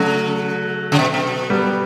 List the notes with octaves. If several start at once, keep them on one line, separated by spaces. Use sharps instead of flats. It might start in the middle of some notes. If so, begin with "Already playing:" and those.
Already playing: C#3 F#3 A3
C#3
B2
B2
G3 B3